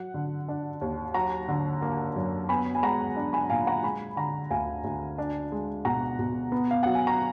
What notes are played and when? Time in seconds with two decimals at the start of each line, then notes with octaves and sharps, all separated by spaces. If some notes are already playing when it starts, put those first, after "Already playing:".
Already playing: F#3 F#5
0.14 D3
0.48 D4
0.81 D#2
1.14 F#3 F#5 A#5
1.48 D3
1.82 A#3
2.16 F#2
2.49 B3 G#5 B5
2.75 G#5
2.83 G#3 F#5 A#5
3.16 D4
3.33 G#5 B5
3.50 A#2 F5 G#5
3.67 F#5 A#5
3.83 G#3 G#5 B5
4.17 D3 F#5 A#5
4.51 D2 F5 G#5
4.84 D2
5.18 D4
5.52 G#3
5.85 B2 F#5 A#5
6.19 B2
6.52 B3
6.71 F5
6.83 F#3 F#5
6.95 G#5
7.07 A#5